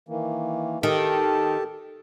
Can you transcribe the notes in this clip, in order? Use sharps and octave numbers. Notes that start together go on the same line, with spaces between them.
D#3 E3 A#3
D#3 G4 A4 A5